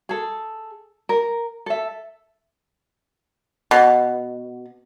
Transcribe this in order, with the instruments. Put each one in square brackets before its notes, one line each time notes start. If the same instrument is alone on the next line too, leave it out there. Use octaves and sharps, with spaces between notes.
[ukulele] G#4 A4
A#4
A4 E5
[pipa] B2